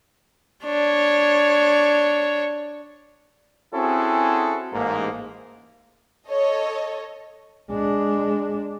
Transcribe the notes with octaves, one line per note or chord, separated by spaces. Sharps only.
D4 C#5
C4 C#4 E4 F#4 G#4 A4
A1 G#2 A#3
A4 C#5 D#5
G#3 D4